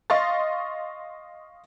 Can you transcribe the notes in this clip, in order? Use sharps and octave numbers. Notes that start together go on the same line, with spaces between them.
D#5 F5 C6 C#6 A6